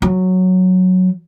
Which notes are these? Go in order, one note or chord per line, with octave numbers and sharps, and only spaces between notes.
F#3